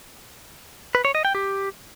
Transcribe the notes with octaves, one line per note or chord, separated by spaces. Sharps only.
B4
C#5
D#5
G5
G4